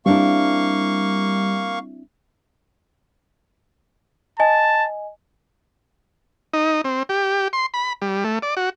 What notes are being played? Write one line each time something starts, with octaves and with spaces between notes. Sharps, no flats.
G3 A#3 C4 D4 E4 F5 C#6
D#5 G#5 A5
D#4
C4
G4
C6
B5
G3
A3
D5
F#4